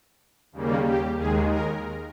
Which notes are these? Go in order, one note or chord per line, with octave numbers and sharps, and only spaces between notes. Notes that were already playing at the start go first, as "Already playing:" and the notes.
D#2 C#3 G3 A#3
G4
D#2 D#3 G#3 G#4
A#4